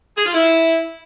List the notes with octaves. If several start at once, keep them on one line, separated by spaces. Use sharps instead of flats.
G#4
F4
E4